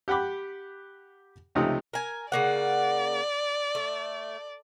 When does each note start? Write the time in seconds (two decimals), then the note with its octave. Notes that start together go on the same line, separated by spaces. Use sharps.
0.08 G4 F#5 G5 B5 D6
1.55 C#2 C3 F3 A3 D#4 D#6
1.93 A#4 G#5
2.32 C#3 A#3 D5 F#5
3.75 A3